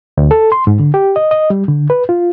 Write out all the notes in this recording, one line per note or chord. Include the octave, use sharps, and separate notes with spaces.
D2
A4
C6
G#2
D3
G4
D#5
D#5
G3
D3
B4
F4